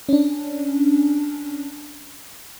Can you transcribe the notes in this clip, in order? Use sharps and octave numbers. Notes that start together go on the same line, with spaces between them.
C#4 D4